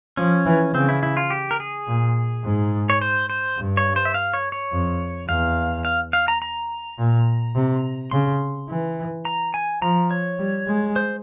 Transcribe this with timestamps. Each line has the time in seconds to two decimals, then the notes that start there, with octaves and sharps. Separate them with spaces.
0.17 F3 C#4
0.46 E3
0.74 C#3 C4
0.89 E4
1.03 E4
1.17 F4
1.30 G4
1.51 A#4
1.60 G#4
1.87 A#2
2.44 G#2
2.90 C#5
3.01 C5
3.30 C5
3.58 G2
3.77 C#5
3.96 C5
4.05 E5
4.14 F5
4.33 C#5
4.52 C#5
4.72 F2
5.28 E2 F5
5.85 F5
6.13 F5
6.28 A#5
6.42 A#5
6.99 A#2
7.55 C3
8.11 C#3 C6
8.69 E3
9.25 A#5
9.54 G#5
9.82 F3 A#5
10.11 C#5
10.39 G3
10.67 G#3
10.96 C5